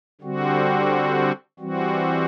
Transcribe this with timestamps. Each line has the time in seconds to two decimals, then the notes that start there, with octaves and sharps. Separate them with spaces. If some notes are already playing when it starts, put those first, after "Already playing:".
0.21 D3 G3 C4 F#4
1.59 E3 G3 C4 F#4